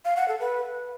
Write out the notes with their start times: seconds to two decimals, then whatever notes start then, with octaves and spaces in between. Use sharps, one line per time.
0.05 F5
0.17 F#5
0.28 A4
0.40 B4